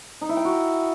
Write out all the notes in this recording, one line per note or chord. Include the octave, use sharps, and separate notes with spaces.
D#4
E4
G5
F#4